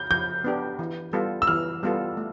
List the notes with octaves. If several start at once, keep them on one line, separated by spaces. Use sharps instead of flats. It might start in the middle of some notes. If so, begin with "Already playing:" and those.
Already playing: G6
F3 G6
B3 D4 G4
E3
G3 B3 F4 A4
E6
E3 F6
G3 B3 F4 A4
A3